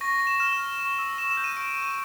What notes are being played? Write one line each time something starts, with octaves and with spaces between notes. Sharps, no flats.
C#6 A#6
C#6
E7
F6 E7
F6
C#6
E6
C#6 E7
E7
G6
D#7
C#6 D7
C#6
D#7